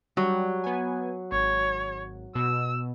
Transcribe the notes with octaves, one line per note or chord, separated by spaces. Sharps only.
F#3 G3
B3 G#5
G#1 C#5
B2 E6